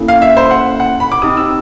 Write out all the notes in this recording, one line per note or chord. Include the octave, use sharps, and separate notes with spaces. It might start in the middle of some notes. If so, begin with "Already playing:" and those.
Already playing: A#3 C#4 E4 A4
F5
E5
C5
F#5
F#5
B5
D6
C4 D#4 G4 D#6
E6